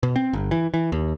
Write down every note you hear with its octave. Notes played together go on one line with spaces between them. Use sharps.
B2
C4
G1
E3
E3
D#2